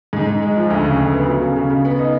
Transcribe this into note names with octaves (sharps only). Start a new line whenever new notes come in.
G#2
G#2
G#3
F3
D2
C#3
D2
B3
F#3
C#3
C#3
C#3
B3
D#4